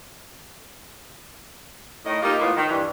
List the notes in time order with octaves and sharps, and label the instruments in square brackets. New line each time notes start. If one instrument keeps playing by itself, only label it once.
[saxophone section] A2 D#3 D#5
A#3 D#4 F4 G4
A2 E3 A#3 B3 F4
D#3
G2 E3